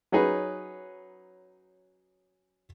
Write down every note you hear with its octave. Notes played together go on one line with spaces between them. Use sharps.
F#3 C#4 D#4 G#4 B4